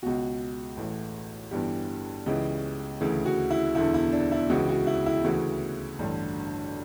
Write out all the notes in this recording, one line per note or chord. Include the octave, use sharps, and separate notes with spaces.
C#2 B2 F#4
A1 A2 E3
G1 G2 E3 G4
C#2 C#3 E3
D2 C#3 E3
F#4
E4
E1 E2 D3 E4
E4
D4
E4
C#2 C#3 E3 F#4
F#4
E4
E4
D2 C#3 E3 F#4
A1 G2 D3